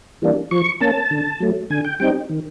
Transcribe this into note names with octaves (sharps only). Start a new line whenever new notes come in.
E3 G3 A#3 D4
F3 C#6
A#3 C#4 A5
D3
F#3 A3
D3 G#5
G5
G3 C4 D#4 G5
D#3